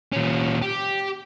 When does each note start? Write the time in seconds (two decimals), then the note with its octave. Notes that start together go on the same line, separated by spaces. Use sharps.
0.12 A#2 C#4
0.62 G4